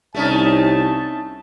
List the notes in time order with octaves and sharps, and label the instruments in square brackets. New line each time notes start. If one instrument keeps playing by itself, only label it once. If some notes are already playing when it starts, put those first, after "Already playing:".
[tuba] C2 [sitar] A3 C#4 D#4 [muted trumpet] A5